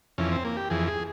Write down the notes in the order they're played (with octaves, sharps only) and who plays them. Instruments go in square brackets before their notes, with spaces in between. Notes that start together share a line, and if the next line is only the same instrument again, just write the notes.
[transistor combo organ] F2 E3 C#4
C4
A#3
G4
F2 E3 G#4
G#4